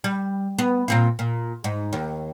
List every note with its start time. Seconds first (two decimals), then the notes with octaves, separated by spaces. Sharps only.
0.04 G3
0.59 B3
0.88 A#2 C4 F4
1.19 A#2
1.64 G#2
1.93 D#2